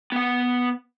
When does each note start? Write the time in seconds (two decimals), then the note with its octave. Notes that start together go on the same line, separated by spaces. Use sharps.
0.12 B3 F#5